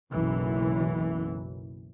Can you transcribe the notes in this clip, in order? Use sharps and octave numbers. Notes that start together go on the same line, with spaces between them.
F#1 B1 F#2 E3